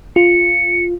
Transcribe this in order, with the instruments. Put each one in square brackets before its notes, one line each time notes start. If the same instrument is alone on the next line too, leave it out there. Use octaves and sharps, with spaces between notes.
[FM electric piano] F4 [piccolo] C#7